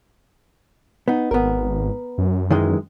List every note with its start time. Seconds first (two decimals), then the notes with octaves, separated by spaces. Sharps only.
1.08 B3 D#4
1.31 G#1 B3 A#4
2.18 F#2
2.51 D#3 E3 G#3